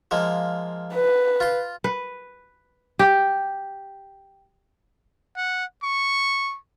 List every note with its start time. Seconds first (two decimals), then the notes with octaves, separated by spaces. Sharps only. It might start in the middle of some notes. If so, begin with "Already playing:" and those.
0.11 F3 G#3 A#3
0.94 B4
1.40 F4 C6
1.84 B4
2.99 G4
5.37 F#5
5.83 C#6